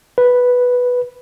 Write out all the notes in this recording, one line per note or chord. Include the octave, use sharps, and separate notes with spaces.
B4